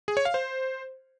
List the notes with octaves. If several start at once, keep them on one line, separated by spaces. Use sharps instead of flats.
G#4
C#5
F5
C5